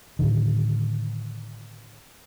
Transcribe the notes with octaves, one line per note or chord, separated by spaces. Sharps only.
A2 D3 D#3